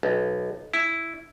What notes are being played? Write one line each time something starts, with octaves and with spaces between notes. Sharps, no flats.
B1
E4